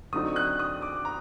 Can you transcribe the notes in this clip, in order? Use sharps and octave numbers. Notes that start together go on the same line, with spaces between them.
D3 F#3 A3 C4 D#4 D#6
F#6
D#6
D6
A#5